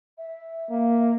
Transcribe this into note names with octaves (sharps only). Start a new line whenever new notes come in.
E5
A#3